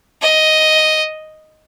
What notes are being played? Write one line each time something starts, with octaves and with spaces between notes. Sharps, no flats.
D#5